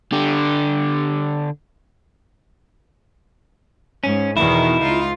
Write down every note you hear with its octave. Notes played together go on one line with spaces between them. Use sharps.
D3 G4
G#2 C#4
E2 B2 D#3 E4
C#2 D#4 F4